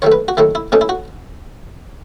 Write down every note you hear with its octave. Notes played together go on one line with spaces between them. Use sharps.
D#3 F#3 A3 C#5
B4
F#4
D#3 F#3 A3 E4
E4
B2 A3 C#4 D#4
E4
F#4